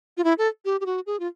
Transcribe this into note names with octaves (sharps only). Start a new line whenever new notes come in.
F4
E4
A4
G4
G4
F#4
G#4
F4